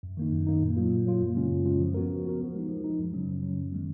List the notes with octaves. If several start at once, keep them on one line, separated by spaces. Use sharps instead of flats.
F#2
D#3 A#3 D#4
F#2
D#3 A#3 D#4
A#2
F#3 A#3 F4
A#2
F#3 A#3 F4
F#2
C#3 G#3 C#4 F4
F#2
C#3 G#3 C#4 F4
F3
B3 F#4 A#4
F3
B3 F#4 A#4
F3
G#3 D#4
F3
G#3 D#4
F#2
C#3 F#3 C#4
F#2
C#3 F#3 C#4
F#2
D#3 G#3 B3